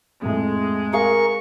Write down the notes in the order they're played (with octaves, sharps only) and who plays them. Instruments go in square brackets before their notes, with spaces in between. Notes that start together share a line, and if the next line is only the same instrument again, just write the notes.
[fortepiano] F2 A2 [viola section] G#3
[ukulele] G#4 F5 [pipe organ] A#4 C#6